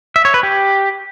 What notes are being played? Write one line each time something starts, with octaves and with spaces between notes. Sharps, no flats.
E5
C#5
B4
G4